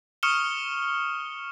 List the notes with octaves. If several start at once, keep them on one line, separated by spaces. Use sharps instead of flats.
C#6 D#6 F6 C#7 E7 G7